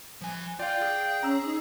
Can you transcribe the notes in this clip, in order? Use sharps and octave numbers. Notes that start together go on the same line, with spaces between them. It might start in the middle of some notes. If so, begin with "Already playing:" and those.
F3 G#5
F4 D5 F5 G5
G#4
C#4 A#5 E6
D#4